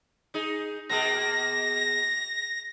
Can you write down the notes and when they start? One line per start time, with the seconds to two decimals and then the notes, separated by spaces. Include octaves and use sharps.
0.34 D#4 G#4
0.90 B2 A#3 G#4 A#6